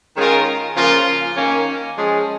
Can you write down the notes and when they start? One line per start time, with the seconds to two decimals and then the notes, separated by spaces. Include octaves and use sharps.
0.16 D#3 G#3 C#4 F4 A#4
0.76 C#3 F3 A#3 F4
1.37 D#3 A#3 C#4
1.98 F3 G#3 C#4 G#4